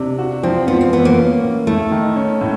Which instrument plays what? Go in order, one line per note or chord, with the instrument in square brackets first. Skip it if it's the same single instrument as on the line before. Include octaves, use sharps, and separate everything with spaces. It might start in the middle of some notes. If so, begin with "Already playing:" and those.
Already playing: [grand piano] C3 D4
F#4
[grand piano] F3 [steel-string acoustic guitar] C4
[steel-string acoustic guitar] B3 [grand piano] F4
[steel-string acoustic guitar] C4
[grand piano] E3 [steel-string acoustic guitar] B3
[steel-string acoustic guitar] A#3
[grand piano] C#4
A2
[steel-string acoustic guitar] A3 [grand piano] E4
[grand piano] D#3
C#4
A2